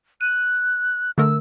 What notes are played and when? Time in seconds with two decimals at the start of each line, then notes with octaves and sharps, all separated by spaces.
0.21 F#6 D#7
1.18 D3 A3 A#4 E6